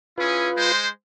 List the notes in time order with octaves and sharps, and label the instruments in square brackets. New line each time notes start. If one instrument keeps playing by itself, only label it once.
[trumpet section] C#4 E4 G#4 [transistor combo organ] F4 B4
[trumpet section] G#3 C5